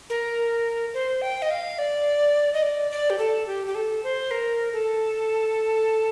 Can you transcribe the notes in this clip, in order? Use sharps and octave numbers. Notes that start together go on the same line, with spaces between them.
A#4
C5
G5
D#5
F5
D5
D#5
D5
D5
G4
A4
G4
G4
A4
C5
A#4
A4